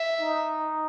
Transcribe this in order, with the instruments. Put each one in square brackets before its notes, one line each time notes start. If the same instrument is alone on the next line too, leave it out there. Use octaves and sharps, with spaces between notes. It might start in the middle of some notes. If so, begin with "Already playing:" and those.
Already playing: [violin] E5
[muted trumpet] D#4